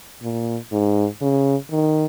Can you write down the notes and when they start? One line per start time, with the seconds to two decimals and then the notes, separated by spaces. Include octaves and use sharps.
0.23 A#2
0.72 G#2
1.21 C#3
1.71 D#3